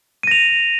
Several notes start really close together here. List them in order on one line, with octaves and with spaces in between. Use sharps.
D#7 A#6 F7